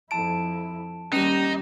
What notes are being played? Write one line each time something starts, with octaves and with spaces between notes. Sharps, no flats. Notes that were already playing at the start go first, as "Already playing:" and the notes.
F2 E4 A5 D7
D#2 G3 C#4 D#4 A#6 E7